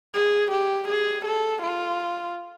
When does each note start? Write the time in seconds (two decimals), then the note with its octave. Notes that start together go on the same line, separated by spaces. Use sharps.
0.15 G#4
0.51 G4
0.88 G#4
1.25 A4
1.62 F4